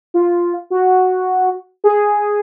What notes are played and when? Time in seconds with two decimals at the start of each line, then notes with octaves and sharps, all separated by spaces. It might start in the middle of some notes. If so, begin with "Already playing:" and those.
0.14 F4
0.70 F#4
1.84 G#4